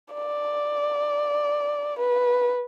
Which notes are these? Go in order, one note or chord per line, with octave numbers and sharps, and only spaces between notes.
D5
B4